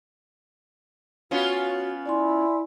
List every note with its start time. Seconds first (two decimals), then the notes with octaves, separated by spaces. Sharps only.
1.31 B3 C#4 F4 F#4
2.06 E4 D5 G#5 C6